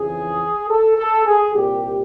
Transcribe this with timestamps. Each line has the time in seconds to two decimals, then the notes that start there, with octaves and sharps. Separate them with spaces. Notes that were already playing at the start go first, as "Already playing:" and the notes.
Already playing: F2 C#3 E3 G#4
0.69 A4
0.98 A4
1.26 G#4
1.53 C2 A#2 G4